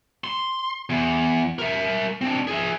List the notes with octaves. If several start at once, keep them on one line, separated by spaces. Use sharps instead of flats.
C6
E2
A#4 E5
C4 D4
G#4 E5